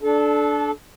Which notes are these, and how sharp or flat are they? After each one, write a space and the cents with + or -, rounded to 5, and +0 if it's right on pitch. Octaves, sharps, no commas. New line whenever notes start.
D4 +0 A4 -25